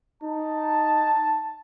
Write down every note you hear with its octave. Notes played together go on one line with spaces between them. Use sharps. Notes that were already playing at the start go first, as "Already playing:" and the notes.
D#4 A5